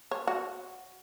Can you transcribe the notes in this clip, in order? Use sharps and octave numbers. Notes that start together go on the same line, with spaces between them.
C#5
F#4